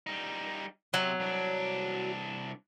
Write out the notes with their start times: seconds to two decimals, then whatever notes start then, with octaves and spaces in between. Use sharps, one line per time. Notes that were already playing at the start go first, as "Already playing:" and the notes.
0.07 G3 D#4
0.94 C3 F#3
1.20 C2 D4